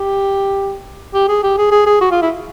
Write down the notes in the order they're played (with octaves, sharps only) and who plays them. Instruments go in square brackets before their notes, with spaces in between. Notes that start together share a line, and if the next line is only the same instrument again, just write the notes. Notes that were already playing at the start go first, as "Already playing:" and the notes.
Already playing: [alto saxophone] G4
G4
G#4
G4
G#4
G#4
G#4
F#4
F4
E4